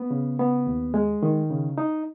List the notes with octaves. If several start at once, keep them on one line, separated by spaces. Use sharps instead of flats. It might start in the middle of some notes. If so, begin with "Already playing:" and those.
Already playing: B3
C#3
B3
D#2
G#3
D#3
C#3
D#4